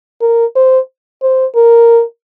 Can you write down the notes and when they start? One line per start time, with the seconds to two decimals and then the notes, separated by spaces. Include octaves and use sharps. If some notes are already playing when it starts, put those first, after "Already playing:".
0.22 A#4
0.56 C5
1.22 C5
1.56 A#4